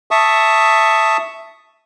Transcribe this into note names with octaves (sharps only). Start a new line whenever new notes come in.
E5 A5 C#6 D#6